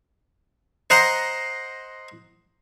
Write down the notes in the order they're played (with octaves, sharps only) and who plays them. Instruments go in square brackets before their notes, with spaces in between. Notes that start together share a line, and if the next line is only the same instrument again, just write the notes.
[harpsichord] C5 D#5 F#5 A#5 C6